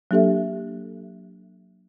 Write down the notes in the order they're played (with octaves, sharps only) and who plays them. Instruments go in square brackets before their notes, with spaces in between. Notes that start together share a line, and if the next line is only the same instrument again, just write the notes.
[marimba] F#3 A#3 D4 G4 A4 E5